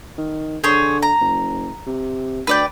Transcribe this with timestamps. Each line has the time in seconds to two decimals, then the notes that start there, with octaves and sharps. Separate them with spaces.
0.18 D#3
0.64 D3 G#4 C5 C#5
1.03 A#5
1.21 F#1
1.87 C3
2.47 D2 B4 D5 G5